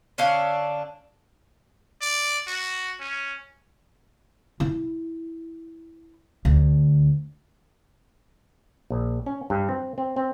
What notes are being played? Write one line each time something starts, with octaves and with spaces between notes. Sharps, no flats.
D3 C#4 D4 F5
D5
F#4
C#4
E4
D2
A#1
C#4
G2
C4
C4
C4